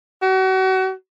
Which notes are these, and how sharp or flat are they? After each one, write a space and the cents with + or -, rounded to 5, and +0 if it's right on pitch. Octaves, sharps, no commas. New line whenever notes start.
F#4 +35